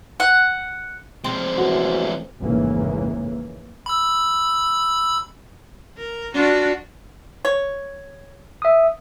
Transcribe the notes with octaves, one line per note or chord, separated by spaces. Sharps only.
F#5
F3 G#3 C4
A1 F#4
A1 F2 G#2 C#3 E3 A#3
B5 E6
A#4
D4 F4 F#4
C#5
E5 D#6